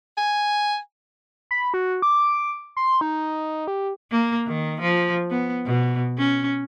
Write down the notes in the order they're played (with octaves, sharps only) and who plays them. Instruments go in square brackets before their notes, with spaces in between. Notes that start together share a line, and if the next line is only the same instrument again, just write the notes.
[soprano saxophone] G#5
[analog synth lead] B5
F#4
D6
C6
D#4
G4
[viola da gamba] A#3
D#3
F3
B3
B2
C#4